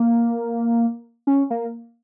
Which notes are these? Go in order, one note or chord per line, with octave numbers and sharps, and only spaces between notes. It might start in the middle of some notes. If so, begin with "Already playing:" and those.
Already playing: A#3
C#4
A#3